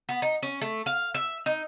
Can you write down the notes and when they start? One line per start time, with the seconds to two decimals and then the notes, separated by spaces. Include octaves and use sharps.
0.09 B3
0.22 D#4
0.43 C#4
0.61 A3
0.86 F5
1.14 E5
1.46 D#4